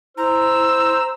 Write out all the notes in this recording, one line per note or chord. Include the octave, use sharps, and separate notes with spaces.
E4 C5 A#5 E6